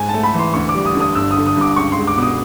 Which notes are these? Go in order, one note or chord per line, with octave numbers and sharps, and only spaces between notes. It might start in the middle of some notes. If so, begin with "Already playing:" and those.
Already playing: G#2 G#5
A5
A3
B5
E3 C6
D2 C#6
D6
G3
D#6
D3
D#6
G1 E6
D#6
D3
D#6
G2
D6
C#2 C#6
C6
G#3
D6
B2 D6 D#6